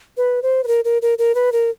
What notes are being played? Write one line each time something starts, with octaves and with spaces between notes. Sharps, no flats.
B4
C5
B4
A#4
A#4
A#4
A#4
B4
A#4